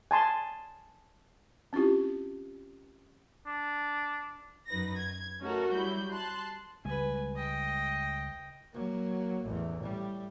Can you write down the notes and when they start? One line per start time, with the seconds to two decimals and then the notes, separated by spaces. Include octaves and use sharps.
0.11 G#5 A5 C6
1.73 C4 C#4 E4 F4 G4
3.47 D4
4.69 F#2 F#3 D#4 B4 A#6
4.99 G#6
5.40 A3 C#4 D#4 F#4 A4 A#4
5.72 F#3 G3 E4 B5 G6
6.11 A5 C6 F#6
6.85 C#2 G3 G#3 B4 G#5
7.36 D#5 G5
8.73 F#3 A#3
9.44 A1 E2
9.82 A2 G3